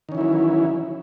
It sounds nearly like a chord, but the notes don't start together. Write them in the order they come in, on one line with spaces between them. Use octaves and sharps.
D#3 C#4 E3 E4 F#3